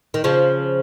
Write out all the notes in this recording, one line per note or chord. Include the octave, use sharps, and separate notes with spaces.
D#3
C#3 F3